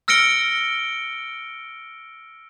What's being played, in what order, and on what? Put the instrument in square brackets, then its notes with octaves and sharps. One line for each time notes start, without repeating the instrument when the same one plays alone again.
[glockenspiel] E6 F6 A#6 C#7 D7 G7